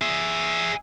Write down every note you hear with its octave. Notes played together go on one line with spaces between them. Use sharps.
G#4 E5